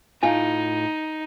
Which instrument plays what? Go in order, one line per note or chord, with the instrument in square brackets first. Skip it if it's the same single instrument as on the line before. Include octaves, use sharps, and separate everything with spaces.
[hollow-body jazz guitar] A2 F4 G#5 [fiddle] D#4